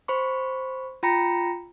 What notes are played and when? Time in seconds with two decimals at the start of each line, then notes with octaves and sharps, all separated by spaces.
0.08 C5 B5 C#6
1.03 F4 G5 A#5 B5 A#6 C#7